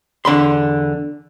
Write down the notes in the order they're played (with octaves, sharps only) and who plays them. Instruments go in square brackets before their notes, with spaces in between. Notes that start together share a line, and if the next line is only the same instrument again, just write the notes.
[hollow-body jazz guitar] E2 D3 B5 C6